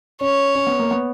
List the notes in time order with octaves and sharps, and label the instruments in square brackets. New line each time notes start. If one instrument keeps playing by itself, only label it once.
[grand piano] C#4 [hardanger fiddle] C#5
[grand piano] C#4
B3
A#3
B3